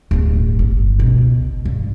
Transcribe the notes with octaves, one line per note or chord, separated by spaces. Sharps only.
D1 G1
G1
C#2 B2
G2